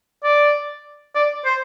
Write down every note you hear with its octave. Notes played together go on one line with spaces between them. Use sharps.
D5
D5
C5